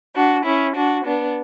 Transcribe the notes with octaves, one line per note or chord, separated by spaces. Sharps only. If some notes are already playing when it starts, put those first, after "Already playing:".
D4 F#4
C#4 E4
D4 F#4
B3 D4